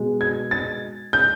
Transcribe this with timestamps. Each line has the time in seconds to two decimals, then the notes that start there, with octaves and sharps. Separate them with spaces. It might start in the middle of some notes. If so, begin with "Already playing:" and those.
Already playing: B2 G#3
0.21 G#6
0.51 A6
1.13 G6